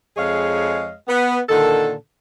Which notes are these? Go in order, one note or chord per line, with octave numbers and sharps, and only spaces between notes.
F2 G#3 G#4 C#5 D#5 F5
B3
A#2 D3 D#3 A4